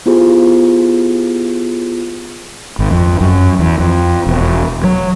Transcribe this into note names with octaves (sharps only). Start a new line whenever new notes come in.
B3 E4 F4 G4 G#4 C5
G#1
F2
F#2
E2
F2
E1
F#3